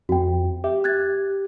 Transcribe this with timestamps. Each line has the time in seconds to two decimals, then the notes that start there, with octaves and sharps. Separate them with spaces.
0.09 F2 F#4 G5
0.64 G4 E5
0.84 F#6 G#6 A6